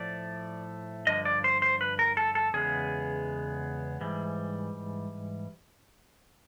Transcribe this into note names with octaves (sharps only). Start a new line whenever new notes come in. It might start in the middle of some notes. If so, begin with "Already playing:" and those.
Already playing: A2 F3 A3 D5
G2 D3 F3 D#5
D5
C5
C5
B4
A#4
A4
A4
E2 C#3 G#3 B3 G#4
G#2 E3 G3